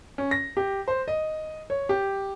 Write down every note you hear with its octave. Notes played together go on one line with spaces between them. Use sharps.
C#4
A#6
G4
C5
D#5
C#5
G4